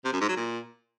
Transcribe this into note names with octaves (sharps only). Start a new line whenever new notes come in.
C3
F#2
G#2
F#3
A#2